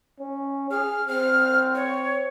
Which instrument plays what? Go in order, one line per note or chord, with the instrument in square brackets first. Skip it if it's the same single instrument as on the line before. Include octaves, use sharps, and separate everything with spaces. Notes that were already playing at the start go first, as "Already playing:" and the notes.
[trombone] C#4
[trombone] G#4 [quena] F6
[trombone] C4 [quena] F6
[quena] C#5